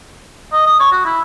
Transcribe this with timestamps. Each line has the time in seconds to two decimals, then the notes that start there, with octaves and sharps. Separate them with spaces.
0.52 D#5
0.67 D#6
0.80 C#5
0.91 F#4
1.05 E4